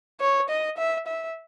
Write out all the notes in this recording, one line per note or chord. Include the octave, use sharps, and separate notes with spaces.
C#5
D#5
E5
E5